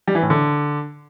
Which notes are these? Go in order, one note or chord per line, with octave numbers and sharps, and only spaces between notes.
G3
E3
A2
D3